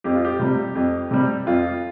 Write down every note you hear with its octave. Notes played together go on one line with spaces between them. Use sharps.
F2 G4
F4
G4
C3 G3
F2
C3 G3
F2 F4